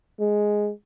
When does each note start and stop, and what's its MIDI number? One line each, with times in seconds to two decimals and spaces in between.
0.20 0.70 56